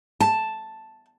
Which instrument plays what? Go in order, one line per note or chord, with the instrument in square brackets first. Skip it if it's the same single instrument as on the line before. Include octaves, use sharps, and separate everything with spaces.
[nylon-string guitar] A5